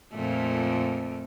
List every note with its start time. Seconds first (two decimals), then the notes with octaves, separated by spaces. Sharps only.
0.14 F2 A#2 A3